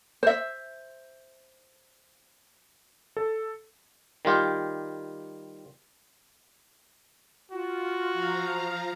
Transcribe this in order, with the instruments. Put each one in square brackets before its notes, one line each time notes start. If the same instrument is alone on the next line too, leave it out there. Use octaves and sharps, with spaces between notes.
[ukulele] C5 E5
[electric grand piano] A4
[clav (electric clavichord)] D#3 G3 F4 G4
[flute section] F4 [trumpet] F#4
[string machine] F3 F5 A#5